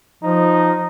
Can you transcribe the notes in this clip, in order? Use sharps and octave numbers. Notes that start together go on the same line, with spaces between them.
F3 D#4